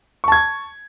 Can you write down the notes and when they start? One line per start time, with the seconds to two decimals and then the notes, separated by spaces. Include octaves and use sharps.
0.24 C#6
0.28 A5
0.32 G#6